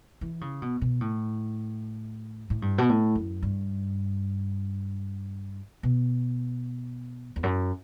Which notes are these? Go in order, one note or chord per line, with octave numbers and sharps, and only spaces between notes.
E3
C#3
B2
B2
A2
A2
G2
B2
A2
F#2
G2
B2
E2
F#2